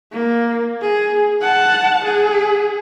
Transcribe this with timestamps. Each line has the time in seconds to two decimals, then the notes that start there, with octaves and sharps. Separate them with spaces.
0.12 A#3
0.81 G#4
1.41 F#5 A5
2.04 G#4